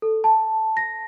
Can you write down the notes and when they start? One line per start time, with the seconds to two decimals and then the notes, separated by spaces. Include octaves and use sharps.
0.02 A4
0.24 A5
0.77 A#6